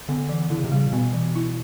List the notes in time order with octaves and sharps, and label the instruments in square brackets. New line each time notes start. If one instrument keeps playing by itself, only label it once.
[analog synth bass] D3 [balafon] B3
[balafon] E3
[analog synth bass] D3 [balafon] E4
[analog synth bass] C#3
C3
[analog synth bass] C#3 [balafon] G3
[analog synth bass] A#2
[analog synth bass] B2 [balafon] B3
[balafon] E3
E4